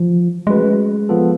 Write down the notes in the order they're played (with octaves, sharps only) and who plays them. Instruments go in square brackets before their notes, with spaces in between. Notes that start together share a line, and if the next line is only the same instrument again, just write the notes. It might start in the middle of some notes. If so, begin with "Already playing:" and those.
Already playing: [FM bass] F3
[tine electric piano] F#3 A3 C#4 F#4 B4 [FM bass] G#3
[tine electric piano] F3 B3 F4 A4